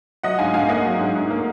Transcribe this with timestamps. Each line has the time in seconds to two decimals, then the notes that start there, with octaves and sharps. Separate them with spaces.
0.23 F#3 D#5 F#5
0.39 G#2 F5 G#5
0.54 G#2 F5 G#5
0.69 A#3 D#5 F#5
0.85 F#3
0.99 G#2
1.15 G#2
1.31 A#3